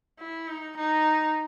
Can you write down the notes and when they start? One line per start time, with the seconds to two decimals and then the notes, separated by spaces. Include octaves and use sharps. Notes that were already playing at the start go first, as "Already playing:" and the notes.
0.19 E4
0.48 D#4
0.77 D#4